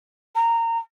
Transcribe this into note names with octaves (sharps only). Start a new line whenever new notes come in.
A#5